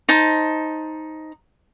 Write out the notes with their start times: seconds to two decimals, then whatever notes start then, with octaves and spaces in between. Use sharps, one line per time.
0.09 D#4 C5 A5